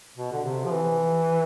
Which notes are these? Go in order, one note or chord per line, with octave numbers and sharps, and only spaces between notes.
B2
D3
C3
F3
E3